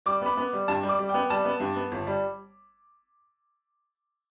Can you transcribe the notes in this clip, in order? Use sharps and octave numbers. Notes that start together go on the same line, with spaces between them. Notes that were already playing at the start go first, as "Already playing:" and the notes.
G3 D6
B3 B5
B3
G3
G2 A5
G3
D6
G3
B3 G5
G3 A5
B3
G2
B3
G1
G3